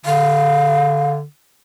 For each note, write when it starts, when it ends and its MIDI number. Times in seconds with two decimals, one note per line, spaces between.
0.06 1.24 50
0.06 1.12 77